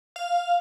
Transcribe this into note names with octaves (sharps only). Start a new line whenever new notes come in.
F5